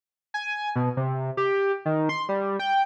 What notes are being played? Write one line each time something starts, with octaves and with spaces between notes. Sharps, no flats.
G#5
B2
C3
G4
D#3
C6
G3
G5